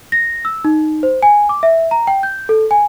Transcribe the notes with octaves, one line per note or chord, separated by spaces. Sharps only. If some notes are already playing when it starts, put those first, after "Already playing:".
A#6
E6
D#4
C5
G#5
D6
E5
A#5
G5
G6
A4
G#5